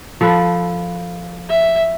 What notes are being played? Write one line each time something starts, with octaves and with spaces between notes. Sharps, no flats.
F3 A4 B4
E5